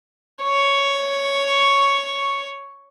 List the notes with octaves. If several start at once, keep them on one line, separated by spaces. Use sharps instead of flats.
C#5 C#6